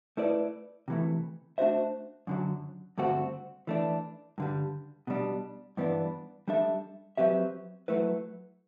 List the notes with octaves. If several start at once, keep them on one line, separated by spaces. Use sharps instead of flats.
A3 E4 B4 D5
C3 E3 A3
A3 D4 F#4 C5 E5
F#2 D3 F#3
G2 D3 A3 C4 F#4
E3 A3 D4
G2 D3 G3
B2 G3 D4
G2 E3 B3 D4
G3 D4 A4 E5
F#3 C4 G4 B4 E5
F#3 A3 E4 B4